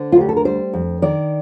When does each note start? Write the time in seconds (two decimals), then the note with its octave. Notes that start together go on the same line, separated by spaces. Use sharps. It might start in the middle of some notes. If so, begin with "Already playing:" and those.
Already playing: D3 C5
0.12 F4
0.16 D2 G4
0.29 A4
0.37 A#4
0.45 G3 C5
0.74 F2
1.02 D#3 D5